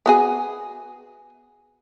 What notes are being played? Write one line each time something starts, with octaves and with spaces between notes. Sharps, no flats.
B3 F#4 G#4